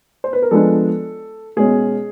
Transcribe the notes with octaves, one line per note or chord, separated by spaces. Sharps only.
C5
B4
A#4
F3 G#3 B3 D4 A4
B2 G#3 C#4 G#4